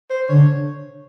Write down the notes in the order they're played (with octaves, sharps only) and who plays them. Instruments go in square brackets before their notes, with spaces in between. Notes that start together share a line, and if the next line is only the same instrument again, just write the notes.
[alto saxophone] C5
[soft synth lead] D3 [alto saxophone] C#5